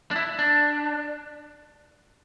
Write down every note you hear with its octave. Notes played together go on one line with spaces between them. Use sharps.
D4
E4
D4